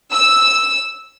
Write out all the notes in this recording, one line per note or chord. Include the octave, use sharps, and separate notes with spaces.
E6